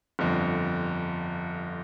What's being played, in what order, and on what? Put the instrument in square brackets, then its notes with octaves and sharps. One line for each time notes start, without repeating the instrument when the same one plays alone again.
[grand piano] G1 F2 D3